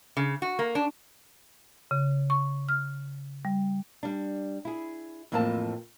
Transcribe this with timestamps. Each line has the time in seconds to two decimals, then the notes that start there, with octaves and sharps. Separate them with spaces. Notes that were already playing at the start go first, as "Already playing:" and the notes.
0.17 C#3
0.42 F#4
0.59 A#3
0.75 D4
1.91 C#3
2.30 C#6
2.69 F6
3.45 G3
4.03 G3 D4
4.65 E4 G#4
5.32 F2 A2 E3 A#3 C4 A5